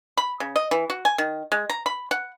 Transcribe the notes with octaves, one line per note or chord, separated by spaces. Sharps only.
B5
C#3
D#5
E3
F#4
G#5
D#3
G#3
A#5
B5
F#5